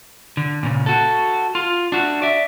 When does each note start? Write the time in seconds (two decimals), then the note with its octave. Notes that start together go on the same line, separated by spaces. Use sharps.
0.37 D3
0.63 A#2 C#3
0.86 F#4 A4
1.55 F4
1.92 D4 F#4
2.22 D5 E5